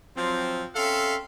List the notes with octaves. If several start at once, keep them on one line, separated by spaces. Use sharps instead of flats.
F3 F#3 C4
C4 C#4 A4 E5 F5